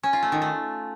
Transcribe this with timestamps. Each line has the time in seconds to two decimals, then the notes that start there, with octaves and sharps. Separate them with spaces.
0.03 C#4
0.13 F4
0.23 A3
0.32 D#3
0.42 A3